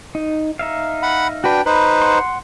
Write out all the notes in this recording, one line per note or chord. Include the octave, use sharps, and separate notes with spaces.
D#4
D#4 E5 F5
F#5 B5
D4 F#4 B4 G5
D#4 B4 C5 B5
F#5 C6